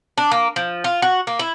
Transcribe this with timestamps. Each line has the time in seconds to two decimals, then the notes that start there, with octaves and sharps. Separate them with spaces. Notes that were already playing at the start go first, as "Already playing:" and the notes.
0.18 D4
0.32 A#3
0.56 F3
0.84 F4
1.02 F#4
1.27 A#3
1.39 E4